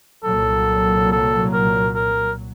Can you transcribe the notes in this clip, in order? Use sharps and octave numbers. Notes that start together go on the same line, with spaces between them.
C2 A#2 F#3 A4
A4
A#4
A#4